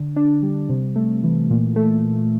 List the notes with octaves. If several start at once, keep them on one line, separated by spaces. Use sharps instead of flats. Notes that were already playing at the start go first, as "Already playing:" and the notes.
Already playing: D3
D4
G3
C3
A3
E3
A#2
A3